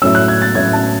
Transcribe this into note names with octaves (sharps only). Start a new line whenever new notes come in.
A2 F#3 C#4 E6
F#6
G#6
A6
A2 F#3 C#4 G#6
A5